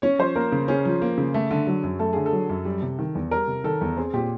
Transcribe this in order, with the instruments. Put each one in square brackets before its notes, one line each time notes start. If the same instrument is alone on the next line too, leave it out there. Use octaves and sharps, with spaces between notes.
[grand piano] C#4 [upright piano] C#5
[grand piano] F3 [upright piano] C5
[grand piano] A#3 [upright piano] A#4
[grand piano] C#3
[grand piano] C#4 [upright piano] G#4
[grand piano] F3
A#3
C#3
A3
D3
F#3
F#2
[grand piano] A3 [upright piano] A4
[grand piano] D3 [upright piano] G#4
[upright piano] A4
[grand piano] F#3
F#2
G3
C3
D#3
E2
[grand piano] G3 [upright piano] A#4
[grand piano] C3
[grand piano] D#3 [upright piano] A4
[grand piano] E2
[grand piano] C4 [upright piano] G#4
[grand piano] A#2 [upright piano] G4